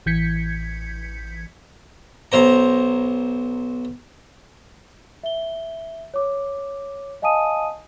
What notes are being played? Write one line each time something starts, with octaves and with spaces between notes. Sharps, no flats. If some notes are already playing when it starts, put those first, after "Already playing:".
A1 E3 G6 G#6 B6 C#7
B1 C5 A#5
E5 G7
C#5 D6
D#5 F5 G#5 A5 D#6 D#7